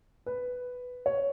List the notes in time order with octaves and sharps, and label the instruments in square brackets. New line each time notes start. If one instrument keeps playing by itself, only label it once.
[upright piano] B4
C#5